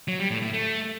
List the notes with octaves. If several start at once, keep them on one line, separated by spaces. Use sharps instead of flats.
F#3
G3
A2
A2
A3